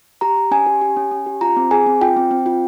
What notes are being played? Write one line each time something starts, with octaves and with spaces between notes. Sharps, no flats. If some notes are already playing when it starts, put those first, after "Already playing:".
G4 A#5
G4
C#4 G#5
G4
G4
C#4
C#4
G4
F4 A#5
C4
G#4 G#5
C4
F4 G5
C4
C4
F4